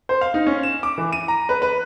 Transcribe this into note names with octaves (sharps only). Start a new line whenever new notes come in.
C5
F5
D#4
C#4
E7
D6
E3
D#7
A#5
B4
B4